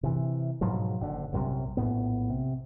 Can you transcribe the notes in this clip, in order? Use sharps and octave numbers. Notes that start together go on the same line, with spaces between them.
C3 E3
G#2 B2 F3 F#3
F#1 D3
A#1 F#2 C3 G3
A#1 A2 B3
C3